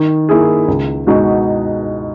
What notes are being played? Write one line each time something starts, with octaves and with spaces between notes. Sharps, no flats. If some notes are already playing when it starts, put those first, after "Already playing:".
Already playing: D#3
A#3 E4 G#4
C#2
B2 G#3 D#4 F#4